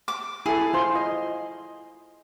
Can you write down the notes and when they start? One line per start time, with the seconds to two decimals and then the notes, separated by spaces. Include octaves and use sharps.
0.08 D6
0.46 E4 G#4 A4
0.74 F4 C5 C6
0.96 D#5